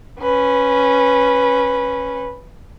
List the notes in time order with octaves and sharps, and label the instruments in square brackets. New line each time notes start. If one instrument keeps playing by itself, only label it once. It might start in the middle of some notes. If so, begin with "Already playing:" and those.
[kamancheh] C#4 B4